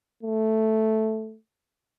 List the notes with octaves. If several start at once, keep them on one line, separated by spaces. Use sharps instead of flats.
A3